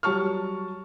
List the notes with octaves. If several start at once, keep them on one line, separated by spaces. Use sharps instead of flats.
F#3 G3 A5 C#6 F6